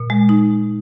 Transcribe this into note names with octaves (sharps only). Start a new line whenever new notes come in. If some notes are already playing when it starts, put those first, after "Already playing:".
Already playing: A#2
G#3
D#4